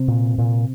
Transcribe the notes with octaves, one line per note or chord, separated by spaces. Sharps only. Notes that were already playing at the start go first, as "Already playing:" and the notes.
Already playing: C3 C4
A#2
A#2